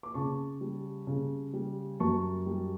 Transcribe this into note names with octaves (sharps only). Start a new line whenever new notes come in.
D6
C#3 A5 C#6
G3
C#3
G3
F#2 A5 C#6
G3